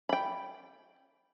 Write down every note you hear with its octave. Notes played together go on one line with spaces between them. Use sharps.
G5 B5